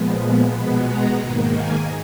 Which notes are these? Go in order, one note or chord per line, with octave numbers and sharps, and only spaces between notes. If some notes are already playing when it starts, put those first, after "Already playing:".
Already playing: A#2 F3 G#3 B3
B2 G#3 B3 B5
A#5
G#2 D#3 A#3
G#5